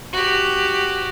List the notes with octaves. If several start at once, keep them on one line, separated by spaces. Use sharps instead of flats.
F#4 G4